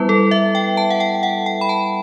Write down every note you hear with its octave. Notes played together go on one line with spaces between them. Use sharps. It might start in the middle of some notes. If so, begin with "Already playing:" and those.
Already playing: G3 B3 E4 B4
A4
E5
G5
A5
F#5
G5
F#5
G5
B5
A5